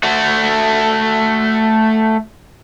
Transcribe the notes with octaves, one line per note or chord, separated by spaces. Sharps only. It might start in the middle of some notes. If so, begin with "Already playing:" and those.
A3 F#4